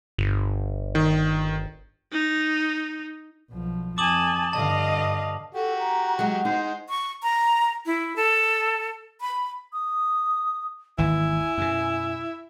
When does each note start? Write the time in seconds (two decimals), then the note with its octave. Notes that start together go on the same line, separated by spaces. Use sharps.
0.18 G1
0.95 D#3
2.12 D#4
3.51 B1 F3
3.98 F2 G#5 A5 D6 D#6 F#7
4.53 G2 D3 D#5 F5 A5
5.54 F#4 G4 A4
5.79 A#5
6.19 F#3 G#3 F#5
6.45 G#3 D#4 C5
6.89 C#6
7.23 A#5
7.86 E4
8.16 A4
9.21 B5
9.73 D#6
10.98 G#1 D#2 E3 E4 G#5
11.58 F#2 B2